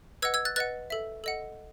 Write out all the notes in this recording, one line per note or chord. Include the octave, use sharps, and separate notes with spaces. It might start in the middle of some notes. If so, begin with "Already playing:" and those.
B4 D#5 F#5 E6 G#6
E6 G#6
F#6 A6
B4 D#5 F#5 F#6 A6
A4 E5
A4 D#5 F#5